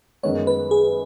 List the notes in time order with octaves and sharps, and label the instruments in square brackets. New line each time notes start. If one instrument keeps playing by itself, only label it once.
[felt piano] F#2 D#3 G#3 B3 [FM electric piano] C#5
[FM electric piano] B4
G#4